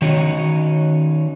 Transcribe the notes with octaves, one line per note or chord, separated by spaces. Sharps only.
D#3 C#4 D#4 F#4 C#5